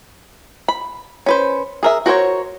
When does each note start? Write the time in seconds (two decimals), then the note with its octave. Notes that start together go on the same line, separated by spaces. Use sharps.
0.68 B5
1.26 C#4 B4 C5
1.83 G#4 A#4 E5
2.06 F#4 A#4 C5 C#5